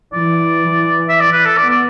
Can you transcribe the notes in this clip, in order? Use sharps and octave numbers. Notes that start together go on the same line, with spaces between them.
E3 D5
E3
E5
D5
B4
A4
B3 D5
D5